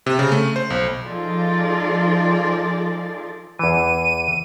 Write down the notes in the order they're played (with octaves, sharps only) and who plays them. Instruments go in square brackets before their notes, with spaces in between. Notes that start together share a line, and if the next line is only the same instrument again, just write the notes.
[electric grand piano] C3
C#3
A3
C5
B1
[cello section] F3 D#4 F4 G#4 A4 D5
[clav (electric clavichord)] E2 E3 [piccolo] D#7